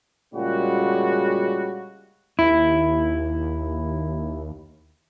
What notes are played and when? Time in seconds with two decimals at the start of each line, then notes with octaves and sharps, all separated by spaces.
0.35 A#2 C#3 G3 G#3 F#4
2.39 D#2 E4